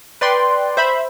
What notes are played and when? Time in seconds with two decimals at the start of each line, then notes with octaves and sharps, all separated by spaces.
0.21 B4 D5 G5 C6
0.77 C5 E5 B5